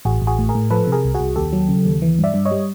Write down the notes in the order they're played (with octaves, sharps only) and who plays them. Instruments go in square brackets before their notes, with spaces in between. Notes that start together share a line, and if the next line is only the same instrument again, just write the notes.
[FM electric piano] A1 F#4 G#4
A1
F#4 G#4
A2
G#4 A#4
A2
F3 A4 B4
C3
G#4 A#4
C2
F#4 G#4
C2
D#2 G4 A4
F#3
C#3
D#2
E3
G2 D5 E5
G2
C#5 D#5
G3